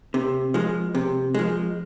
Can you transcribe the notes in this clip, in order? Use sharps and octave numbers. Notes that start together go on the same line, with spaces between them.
C3
F3 G#3
C3
F3 G#3